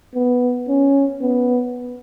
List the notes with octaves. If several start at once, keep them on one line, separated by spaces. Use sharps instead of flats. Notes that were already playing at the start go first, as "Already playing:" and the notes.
B3
C#4
B3